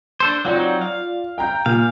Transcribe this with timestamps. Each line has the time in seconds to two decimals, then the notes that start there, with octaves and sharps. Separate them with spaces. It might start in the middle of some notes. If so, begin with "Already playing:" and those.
0.20 D4 A4 C5
0.45 F#3 C4 D#4 F4 D5
0.81 F5
1.38 G5 A#5 G6
1.66 A#2 F5